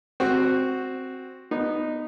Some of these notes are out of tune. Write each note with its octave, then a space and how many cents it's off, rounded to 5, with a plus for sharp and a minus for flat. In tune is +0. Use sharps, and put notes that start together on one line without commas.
C4 +0 F#4 +0
B3 +0 D#4 -10